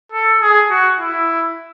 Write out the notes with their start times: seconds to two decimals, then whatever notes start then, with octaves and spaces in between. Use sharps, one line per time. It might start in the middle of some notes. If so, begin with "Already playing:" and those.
0.12 A4
0.42 G#4
0.70 F#4
1.00 E4